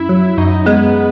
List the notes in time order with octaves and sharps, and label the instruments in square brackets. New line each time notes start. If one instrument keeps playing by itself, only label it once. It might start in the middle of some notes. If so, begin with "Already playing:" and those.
Already playing: [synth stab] F#2 [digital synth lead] E4
[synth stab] F#3
[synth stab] F#2 [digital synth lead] D#4
[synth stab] G#3 [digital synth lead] B3